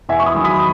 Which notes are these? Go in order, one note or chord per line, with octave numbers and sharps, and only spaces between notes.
E2 E5 G#5
C#6
B5 D#6
D#3 F#3
B5 D#6